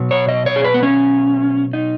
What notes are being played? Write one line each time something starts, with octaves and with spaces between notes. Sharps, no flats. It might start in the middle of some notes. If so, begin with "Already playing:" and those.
Already playing: B2 F#3
C#5
D#5
C#5
G#4
B4
B3
C#4
D#4